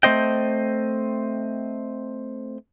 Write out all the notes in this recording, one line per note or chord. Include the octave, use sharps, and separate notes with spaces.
A3 C4 C5 D#5 G5